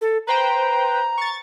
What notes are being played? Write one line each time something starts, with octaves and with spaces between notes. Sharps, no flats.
A4
B4 C5 G5 A#5
C#6 A6